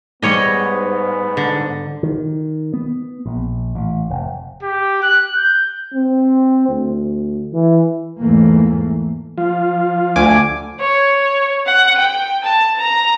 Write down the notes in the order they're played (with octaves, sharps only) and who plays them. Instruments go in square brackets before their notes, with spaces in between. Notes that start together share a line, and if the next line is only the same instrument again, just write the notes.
[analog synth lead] G#2 [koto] G3 C#5 D#5 [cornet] B3
[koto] D3
[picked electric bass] D#3
B3
A#1
A1
F1
[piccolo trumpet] G4
F#6
G6
[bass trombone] C4
D2
E3
[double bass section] E2 G#2 E3 A3 A#3
[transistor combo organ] F3 F4
[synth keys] D2 G#5 D6
[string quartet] C#5
F#5
G5
A5
A#5